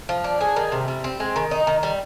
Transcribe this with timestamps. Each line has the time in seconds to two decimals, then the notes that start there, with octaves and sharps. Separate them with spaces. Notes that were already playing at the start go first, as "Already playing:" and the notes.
0.09 F3
0.24 D4
0.41 G#4
0.56 D#3
0.72 C3
0.88 G3
1.04 C4
1.20 G#3
1.36 D#3
1.51 D#4
1.67 D#3
1.83 G3